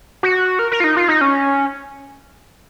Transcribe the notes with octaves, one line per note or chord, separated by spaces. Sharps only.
F#4
A#4
A#4
F4
D#4
F4
D#4
C#4